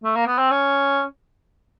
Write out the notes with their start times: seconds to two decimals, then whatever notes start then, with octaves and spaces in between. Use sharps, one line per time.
0.04 A3
0.16 A#3
0.27 B3
0.38 C4
0.51 C#4